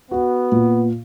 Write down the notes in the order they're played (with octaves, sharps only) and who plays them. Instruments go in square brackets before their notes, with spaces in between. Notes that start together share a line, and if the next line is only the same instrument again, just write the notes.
[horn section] B3 [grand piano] F#4
[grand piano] A#2